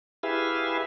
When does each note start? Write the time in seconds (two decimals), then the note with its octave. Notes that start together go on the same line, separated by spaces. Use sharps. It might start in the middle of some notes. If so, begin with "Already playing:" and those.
0.23 E4 G4 G#4 B4 E5 F5